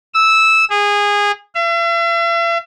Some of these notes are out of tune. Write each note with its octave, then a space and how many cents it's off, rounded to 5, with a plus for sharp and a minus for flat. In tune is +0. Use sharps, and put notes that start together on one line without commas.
E6 -10
G#4 -20
E5 +45